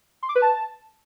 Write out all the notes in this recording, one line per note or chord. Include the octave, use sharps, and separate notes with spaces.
C6
D6
B4
A5